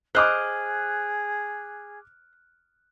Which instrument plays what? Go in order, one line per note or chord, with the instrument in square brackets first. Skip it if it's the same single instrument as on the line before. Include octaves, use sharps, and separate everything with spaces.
[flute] G#4 [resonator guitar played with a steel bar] C5 D#5 [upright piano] D6 F6 F#6